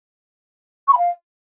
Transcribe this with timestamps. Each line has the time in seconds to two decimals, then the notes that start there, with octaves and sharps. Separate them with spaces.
0.88 C#6
0.93 B5
0.98 F5